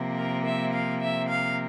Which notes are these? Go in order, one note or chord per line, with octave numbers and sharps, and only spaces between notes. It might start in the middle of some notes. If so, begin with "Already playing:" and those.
Already playing: C3 F3 A#3
A#4
E5
F5
E5
F5